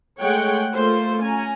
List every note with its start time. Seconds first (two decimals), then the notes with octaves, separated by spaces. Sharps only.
0.19 G#3 A3 C#5 F#5 G5
0.73 A3 A#3 F4 A4 C5
1.20 C#4 G#5 A#5